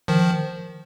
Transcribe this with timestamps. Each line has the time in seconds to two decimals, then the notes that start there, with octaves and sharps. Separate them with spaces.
0.08 D#3 F3